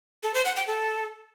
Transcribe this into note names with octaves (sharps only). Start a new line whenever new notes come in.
A4
C5
F#5
G5
A4